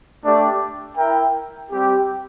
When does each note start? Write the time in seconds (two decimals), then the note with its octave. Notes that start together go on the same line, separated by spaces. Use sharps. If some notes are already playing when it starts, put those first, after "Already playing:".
0.25 A3 D4 G4 D5
0.98 E4 A#4 E5 G5
1.70 G3 C4 G4